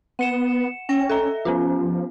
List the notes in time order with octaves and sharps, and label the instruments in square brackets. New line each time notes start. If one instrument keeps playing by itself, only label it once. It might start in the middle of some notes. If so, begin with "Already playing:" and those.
[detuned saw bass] B3 [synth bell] F#5 C#7 E7
[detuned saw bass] C#4 [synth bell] G5 A#6
[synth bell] A4 E5 A#5
[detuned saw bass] F3 [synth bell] B3 C#4 F4